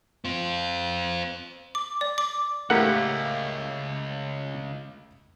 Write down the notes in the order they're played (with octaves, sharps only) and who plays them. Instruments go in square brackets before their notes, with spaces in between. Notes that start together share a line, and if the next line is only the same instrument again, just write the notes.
[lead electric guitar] C4 F4
[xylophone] D6
D5
D6
[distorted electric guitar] C#2 [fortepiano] A2 A#3 G4 [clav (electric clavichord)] F#5